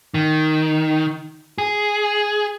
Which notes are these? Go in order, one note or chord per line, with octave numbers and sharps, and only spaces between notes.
D#3
G#4